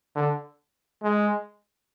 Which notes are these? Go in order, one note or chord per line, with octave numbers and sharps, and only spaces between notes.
D3
G#3